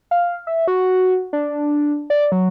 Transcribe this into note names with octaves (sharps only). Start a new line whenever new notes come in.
F5
E5
F#4
D4
D5
F#3